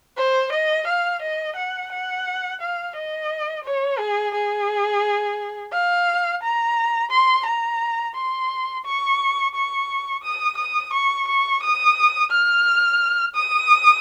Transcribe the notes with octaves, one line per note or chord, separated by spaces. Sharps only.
C5
D#5
F5
D#5
F#5
F#5
F5
D#5
C#5
G#4
G#4
F5
A#5
C6
A#5
C6
C#6
C#6
D#6
D#6
C#6
C#6
D#6
F6
D#6